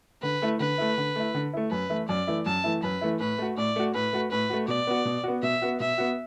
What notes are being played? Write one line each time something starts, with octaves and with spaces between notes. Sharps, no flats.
D3 B4
A3 E4
D3 B4
A3 E4
D3
A3 E4
D3
A3 E4
F#2 B4
E3 A3 E4
F#2 D5
E3 A3 E4
F#2 A5
E3 A3 E4
F#2 B4
E3 A3 E4
A2 B4
A3 F#4
A2 D5
A3 F#4
A2 B4
A3 F#4
A2 B4
A3 F#4
B2 D5
B3 F#4
B2
B3 F#4
B2 E5
B3 F#4
B2 E5
B3 F#4